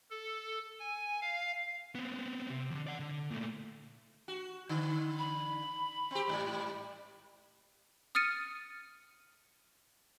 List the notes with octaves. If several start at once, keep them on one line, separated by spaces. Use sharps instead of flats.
A4
G#5
F5
B3 C4
C3 G4
E2 D3
D5 F#5
D3
A#2 A3
F#4
D3
B5
C4 G4
G#2 C#3 G3
D#6 F6 A6 C#7 D#7